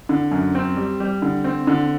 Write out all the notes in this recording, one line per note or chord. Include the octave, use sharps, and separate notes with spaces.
D3
F#2
C4
G3
G3
D3
C4
D3